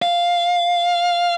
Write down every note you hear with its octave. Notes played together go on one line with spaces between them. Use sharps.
F5